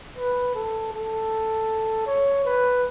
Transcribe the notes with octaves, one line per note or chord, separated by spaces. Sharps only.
B4
A4
A4
C#5
B4